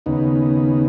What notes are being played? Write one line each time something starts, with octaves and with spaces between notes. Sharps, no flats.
D#2 C#3 B3 D#4